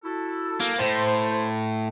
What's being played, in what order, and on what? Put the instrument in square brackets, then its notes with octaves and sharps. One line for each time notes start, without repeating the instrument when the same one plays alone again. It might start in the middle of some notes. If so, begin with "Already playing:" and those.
[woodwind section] E4 F#4 A4
[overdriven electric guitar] A#3
[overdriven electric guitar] A2 [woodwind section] C5